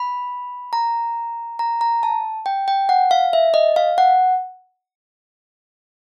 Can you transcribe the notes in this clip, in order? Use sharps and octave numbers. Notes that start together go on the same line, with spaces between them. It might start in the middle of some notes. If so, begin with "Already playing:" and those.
Already playing: B5
A#5
A#5
A#5
A5
G5
G5
F#5
F5
E5
D#5
F5
F#5